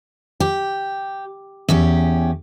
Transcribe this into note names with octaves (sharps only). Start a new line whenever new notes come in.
G4
E2 C#4 G4